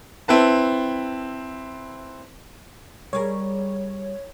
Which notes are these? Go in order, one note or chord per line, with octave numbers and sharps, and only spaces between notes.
C4 E4 B4 A5
G3 G#4 A#4 C#5